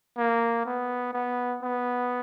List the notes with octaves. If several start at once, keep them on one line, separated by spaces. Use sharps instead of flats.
A#3
B3
B3
B3